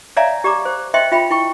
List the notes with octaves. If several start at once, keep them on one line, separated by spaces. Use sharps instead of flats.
C#5 D5 E5 F5 G#5 A#5
G4 D5 A#5 D6
C5
C5 D#5 E5 G5 C6
F4 E5 G5 B5
E4 G5 C#6